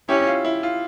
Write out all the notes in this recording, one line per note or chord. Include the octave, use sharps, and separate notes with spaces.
C#4 E4 G4
F4
E4
F4